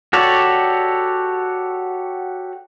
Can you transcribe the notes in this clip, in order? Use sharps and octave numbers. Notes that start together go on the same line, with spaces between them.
F#4 G4 A4 C#5 D5